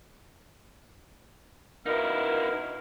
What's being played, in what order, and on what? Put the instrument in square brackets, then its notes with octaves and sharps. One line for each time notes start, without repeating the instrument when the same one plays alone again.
[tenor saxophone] B2 [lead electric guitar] D#4 E4 [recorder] A#4 [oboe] F5